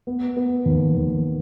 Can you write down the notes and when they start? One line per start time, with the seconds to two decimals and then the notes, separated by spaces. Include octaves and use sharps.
0.07 B3
0.37 B3
0.66 D#2
0.95 D#2